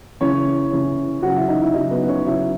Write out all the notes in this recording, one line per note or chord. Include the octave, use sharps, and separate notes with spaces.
C#3 E3 C#4 C#5
C#3 E3
C#3 F#3 F#4 F#5
E4 E5
D#4 D#5
E4 E5
C#3 F#3 D#4 D#5
B3 B4
C#4 C#5
C#3 F#3 E4 E5